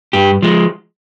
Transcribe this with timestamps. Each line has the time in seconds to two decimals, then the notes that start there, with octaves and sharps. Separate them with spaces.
0.13 G2 G4
0.42 F3 G#3